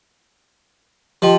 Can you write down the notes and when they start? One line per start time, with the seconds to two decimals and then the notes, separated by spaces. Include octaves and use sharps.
1.22 F3 G4 D#5 G5